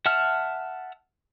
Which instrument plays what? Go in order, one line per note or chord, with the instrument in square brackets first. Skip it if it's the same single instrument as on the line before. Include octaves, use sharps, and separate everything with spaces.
[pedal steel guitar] E5 F#5 A5 F6